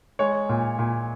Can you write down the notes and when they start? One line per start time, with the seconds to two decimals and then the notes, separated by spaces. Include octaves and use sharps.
0.19 G#3 C#5
0.49 A#2
0.79 A#2